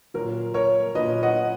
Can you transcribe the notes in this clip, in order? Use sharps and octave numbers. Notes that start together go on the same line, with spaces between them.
A#2 F#3 A#4
A#4 C#5
A#2 F#3 B4 D#5
D#5 F#5